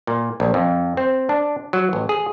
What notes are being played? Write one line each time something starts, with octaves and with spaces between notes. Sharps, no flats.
A#2
A#1
F2
C4
D4
F#3
A1
G#4